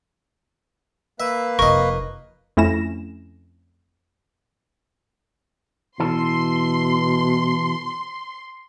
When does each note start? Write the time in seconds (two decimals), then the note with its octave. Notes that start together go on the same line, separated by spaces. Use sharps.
1.20 A#3 B4 E5
1.59 F1 D#4 A#4 D#5 C#6
2.57 F2 A3 C#4 E4 A#6 E7
6.00 B2 E3 A4 C6